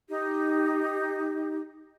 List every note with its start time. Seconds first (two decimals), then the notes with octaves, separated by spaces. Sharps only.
0.08 D#4 G4